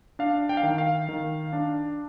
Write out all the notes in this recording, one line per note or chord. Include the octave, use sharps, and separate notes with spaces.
D4 F5
G5
F5
D#3 G5
F5
D#3
D4